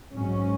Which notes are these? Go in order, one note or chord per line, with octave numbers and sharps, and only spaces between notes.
G#2 F#3 C#4